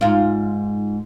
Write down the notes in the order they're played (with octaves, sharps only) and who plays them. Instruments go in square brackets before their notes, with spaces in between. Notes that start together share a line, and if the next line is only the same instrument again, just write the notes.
[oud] G#2 F4